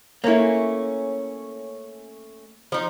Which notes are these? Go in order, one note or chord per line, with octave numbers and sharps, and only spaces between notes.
A3 A#3 C#4 E4
F3 D#4